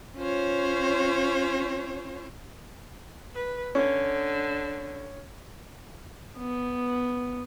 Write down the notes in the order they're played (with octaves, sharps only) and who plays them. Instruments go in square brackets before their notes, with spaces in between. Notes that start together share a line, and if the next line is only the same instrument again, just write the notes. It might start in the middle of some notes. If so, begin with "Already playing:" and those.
[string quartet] C#4 F4 C5 C#5
[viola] B4
[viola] D3 [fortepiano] C#4
[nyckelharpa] B3